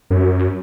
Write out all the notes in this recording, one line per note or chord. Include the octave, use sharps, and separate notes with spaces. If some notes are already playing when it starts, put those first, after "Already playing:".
F#2